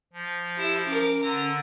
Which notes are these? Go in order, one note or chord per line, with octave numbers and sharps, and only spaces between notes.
F3
E4 G4 E6
C#4 A#4 D6
D3 A#5